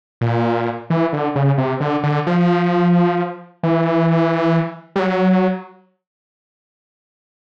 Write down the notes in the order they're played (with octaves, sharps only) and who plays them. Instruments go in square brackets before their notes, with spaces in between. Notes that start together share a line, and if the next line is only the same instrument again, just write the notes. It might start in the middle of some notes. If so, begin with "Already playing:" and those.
[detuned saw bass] A#2
E3
D3
C#3
C3
D3
D3
F3
E3
G3
F#3